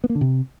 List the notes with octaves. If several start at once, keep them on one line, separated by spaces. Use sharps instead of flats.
B3
A#3
D3
C3